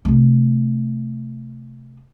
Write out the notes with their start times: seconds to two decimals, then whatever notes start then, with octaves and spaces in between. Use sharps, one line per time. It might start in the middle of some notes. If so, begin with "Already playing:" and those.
0.05 C3 A3